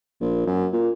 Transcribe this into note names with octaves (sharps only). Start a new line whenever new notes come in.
A#1
F#2
A#2